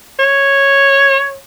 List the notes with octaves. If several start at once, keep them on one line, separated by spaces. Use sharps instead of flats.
C#5